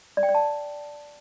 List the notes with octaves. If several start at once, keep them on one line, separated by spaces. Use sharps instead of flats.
D5
G5
D5
A5